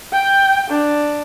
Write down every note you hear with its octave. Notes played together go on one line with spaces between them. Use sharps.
G5
D4